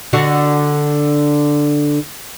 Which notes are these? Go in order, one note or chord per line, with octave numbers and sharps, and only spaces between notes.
D3 D4 F#4